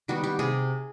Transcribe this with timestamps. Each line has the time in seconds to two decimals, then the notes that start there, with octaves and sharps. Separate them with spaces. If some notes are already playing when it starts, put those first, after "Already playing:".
0.08 D#3 G3 B3 F#4
0.24 G4
0.39 C3 G#4